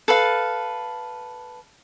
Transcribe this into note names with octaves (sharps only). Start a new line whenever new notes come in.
A4 B4 F5